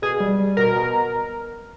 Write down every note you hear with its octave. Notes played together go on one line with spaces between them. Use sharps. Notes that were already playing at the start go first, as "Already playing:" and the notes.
B2 G#4
G3
G3
B2 A#4
B2